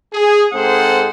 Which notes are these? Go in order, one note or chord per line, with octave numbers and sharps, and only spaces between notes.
G#4
G#2 C4 G#4 A4 C5 F#5